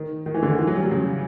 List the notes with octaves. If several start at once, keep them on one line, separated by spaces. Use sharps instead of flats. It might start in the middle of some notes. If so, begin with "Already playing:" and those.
Already playing: D#3
D#3
E3
D3
D#3
E3
F#3
G3
F#3
C#3